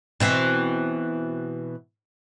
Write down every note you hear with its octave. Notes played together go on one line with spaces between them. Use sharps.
B2 E3 C4